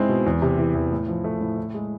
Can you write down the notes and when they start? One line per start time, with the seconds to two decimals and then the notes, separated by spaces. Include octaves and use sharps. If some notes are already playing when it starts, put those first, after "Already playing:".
Already playing: G#2 G#3 C4 E4
0.09 B2
0.26 E2
0.42 C3
0.58 E3
0.75 E2
0.92 A2
1.08 F3
1.24 A3
1.41 A2
1.57 E4
1.74 G#3